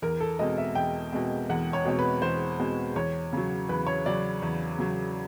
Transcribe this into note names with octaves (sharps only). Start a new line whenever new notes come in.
E2 A#4
A4
B2 G#3 C4 D#5
E5
E2 G5
B2 G#3 C4
E2 F#5
C#5
B2 G#3 C4
B4
E2 C5
B2 G#3 C4
E2 C#5
C#3 F#3
E2 B4
C#5
C#3 F#3 D5
E2
C#3 F#3